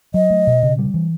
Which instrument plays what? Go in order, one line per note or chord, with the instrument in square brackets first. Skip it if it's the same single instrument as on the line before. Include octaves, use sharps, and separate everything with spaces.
[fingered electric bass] F#3 [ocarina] D#5
[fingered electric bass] A3
B2
C#3
G3
E3